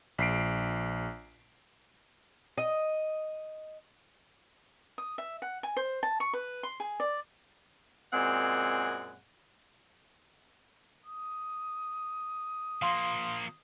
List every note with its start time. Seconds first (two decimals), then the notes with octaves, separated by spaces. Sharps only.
0.18 A#1 B6 C7 D7
2.57 D#5
4.98 D#6
5.18 E5
5.42 F#5
5.63 G#5
5.77 C5
6.03 A5
6.20 C#6
6.33 B4
6.63 C6
6.80 G#4
7.00 D5
8.12 F#2 A#2 G#3 C4 F#5
11.06 D#6
12.82 F3 A#3 F5 C6